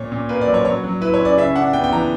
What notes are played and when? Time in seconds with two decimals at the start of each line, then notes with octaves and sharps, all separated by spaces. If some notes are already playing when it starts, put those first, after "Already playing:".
Already playing: A#2 C#5
0.12 A#2
0.29 A#3 B4
0.41 D5
0.47 F#3
0.54 C#5
0.65 F#3 C#5
0.84 F#3
1.01 E4 B4
1.14 C#5
1.20 C#4
1.25 D5
1.37 C#3 E5
1.55 D4 F#5
1.73 B3 G5
1.84 G5
1.92 E3 A#5